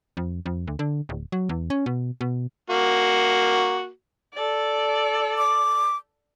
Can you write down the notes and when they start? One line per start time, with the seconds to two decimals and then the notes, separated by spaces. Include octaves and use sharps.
0.17 F2
0.46 F2
0.67 D2
0.79 D3
1.09 D1
1.32 F#3
1.49 E2
1.70 C#4
1.86 B2
2.21 B2
2.70 A#3 F#4
4.33 A4 D5
5.38 D6